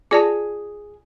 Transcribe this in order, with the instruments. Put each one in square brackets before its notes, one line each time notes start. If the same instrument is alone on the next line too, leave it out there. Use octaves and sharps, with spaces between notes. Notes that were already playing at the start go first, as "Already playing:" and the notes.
[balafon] F4 D5 A5 [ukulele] G#4